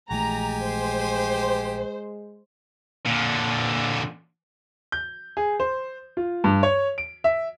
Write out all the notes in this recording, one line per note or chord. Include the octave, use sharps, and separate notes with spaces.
A#1 E3 G#3 A3 G4 G#5 A#5
C5
A#2 D3
G6
G#4
C5
F4
G2
C#5
D7
E5